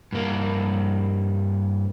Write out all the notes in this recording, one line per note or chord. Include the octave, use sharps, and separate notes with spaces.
G2 A#3